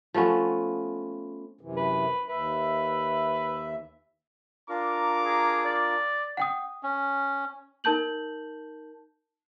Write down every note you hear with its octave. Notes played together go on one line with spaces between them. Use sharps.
F3 A3 B3 C#4
F#2 C3 E3
B4
D#2 B4 E5
D4 F4 A#4 A#5 D6
G#4
D5
F#5 G5 D#6
C#4
D#4 A#4 A5 G6 F#7